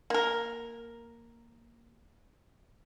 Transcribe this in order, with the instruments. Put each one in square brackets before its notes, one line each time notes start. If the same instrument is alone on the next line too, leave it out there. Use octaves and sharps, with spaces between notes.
[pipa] A#3 A#4